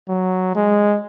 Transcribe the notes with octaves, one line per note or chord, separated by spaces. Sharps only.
F#3
G#3